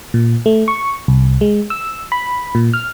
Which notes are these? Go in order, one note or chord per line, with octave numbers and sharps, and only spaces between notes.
A#2
A3
C#6
C2
G#3
E6
B5
A#2
F6